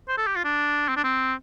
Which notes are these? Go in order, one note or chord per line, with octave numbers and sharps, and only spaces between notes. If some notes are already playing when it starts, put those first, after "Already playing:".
C5
A4
G4
F4
D4
C4
D4
C4